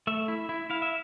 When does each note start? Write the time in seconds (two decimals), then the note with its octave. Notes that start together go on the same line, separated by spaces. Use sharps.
0.07 A3 E5
0.28 E4
0.49 E4
0.70 E4 F5
0.82 E5